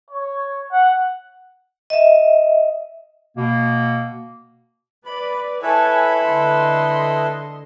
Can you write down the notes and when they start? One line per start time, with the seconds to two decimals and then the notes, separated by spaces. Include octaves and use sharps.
0.11 C#5
0.72 F#5
1.90 D#5 E5
3.37 B2 A#3
5.06 B4 D5 B5
5.62 E4 A4 B4 C#5 G#5 A5
6.23 D3 D#5 C6